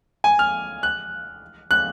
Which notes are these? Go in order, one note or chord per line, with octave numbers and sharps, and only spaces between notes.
G#5
F6
F#6
F#6